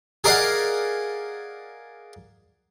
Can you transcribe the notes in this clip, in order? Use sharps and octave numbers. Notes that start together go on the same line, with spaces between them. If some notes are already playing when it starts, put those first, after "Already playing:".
G#4 A#4 D5 D#5 F5 F#5